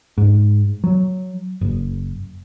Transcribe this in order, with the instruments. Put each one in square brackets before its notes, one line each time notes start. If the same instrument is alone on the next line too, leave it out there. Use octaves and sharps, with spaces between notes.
[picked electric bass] G#2
F#3
F#1